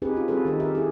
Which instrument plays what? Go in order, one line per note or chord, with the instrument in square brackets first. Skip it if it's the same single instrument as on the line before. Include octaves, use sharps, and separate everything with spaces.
[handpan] C4 D#4 G4 G#4 B4
C#4 F4
G3 C4 F#4 G#4 A4 B4
D#3 D#4 B4
G4 A#4 E5
E4 G4 G#4